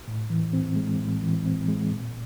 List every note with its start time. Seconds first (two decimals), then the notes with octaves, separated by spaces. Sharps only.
0.08 A2
0.30 E3
0.53 C4
0.76 G#3
1.00 A2
1.22 E3
1.45 C4
1.68 G#3
1.92 A#2